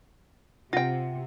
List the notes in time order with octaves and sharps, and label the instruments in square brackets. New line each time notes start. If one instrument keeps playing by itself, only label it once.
[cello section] C3 [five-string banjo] F4 G5 [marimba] F#5 A#6